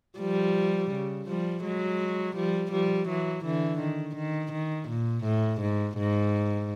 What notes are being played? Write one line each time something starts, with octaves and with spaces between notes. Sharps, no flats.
F3 G3
C#3
F3 G3
F#3 G#3
F3 G3
F3 G3
E3 F#3
D3 E3
D#3
D#3
D#3
A#2
A2
G#2
G#2